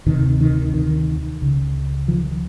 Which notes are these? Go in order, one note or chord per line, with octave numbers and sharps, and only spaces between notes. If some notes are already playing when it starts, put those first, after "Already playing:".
D2 C3 D#3
D#3
D#3
C#2 C#3
D#3 F3